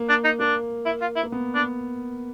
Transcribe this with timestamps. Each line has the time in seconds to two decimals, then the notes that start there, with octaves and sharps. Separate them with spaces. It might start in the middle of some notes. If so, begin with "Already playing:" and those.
Already playing: A#3
0.09 D4
0.24 D#4
0.40 A#3 D4
0.86 E4
1.01 F4
1.16 E4
1.23 A#3
1.32 B3
1.55 D4